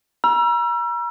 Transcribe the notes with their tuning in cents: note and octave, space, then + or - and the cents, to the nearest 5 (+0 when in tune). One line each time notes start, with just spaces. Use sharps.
A#5 +40 E6 +35